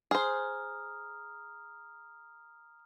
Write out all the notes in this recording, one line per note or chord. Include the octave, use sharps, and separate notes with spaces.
G#4 C5 A#5 D#6 F6